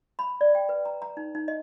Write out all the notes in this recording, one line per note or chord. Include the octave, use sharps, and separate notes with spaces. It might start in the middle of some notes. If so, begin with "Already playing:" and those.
B5
D5
G5
B4
A#5
A#5
D#4
D#4
D#5